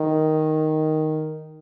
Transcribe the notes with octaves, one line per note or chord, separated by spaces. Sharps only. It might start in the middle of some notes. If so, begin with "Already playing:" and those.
Already playing: D#3